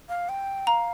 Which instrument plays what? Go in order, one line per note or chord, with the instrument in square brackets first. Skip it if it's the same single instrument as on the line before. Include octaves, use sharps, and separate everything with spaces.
[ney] F5
G5
[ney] F5 [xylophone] A#5